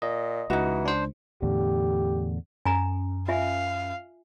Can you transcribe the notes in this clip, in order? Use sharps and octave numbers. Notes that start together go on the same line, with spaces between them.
A#2 D#5
C#2 E3 D#4 F#4
D4 C5
E2 A2 D3 G4
F#2 G#5 A#5
F4 E5 F5 G#5